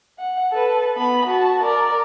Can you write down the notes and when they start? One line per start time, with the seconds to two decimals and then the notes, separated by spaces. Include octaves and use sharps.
0.19 F#5
0.51 A4 B4
0.97 B3 B5
1.28 F#4 A5
1.62 A#4 D5